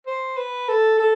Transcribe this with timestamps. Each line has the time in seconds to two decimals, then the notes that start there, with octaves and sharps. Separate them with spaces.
0.07 C5
0.37 B4
0.69 A4
0.99 A4